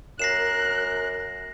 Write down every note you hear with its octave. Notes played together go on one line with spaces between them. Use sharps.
F#2 A#4 F#6 A#6 C7 E7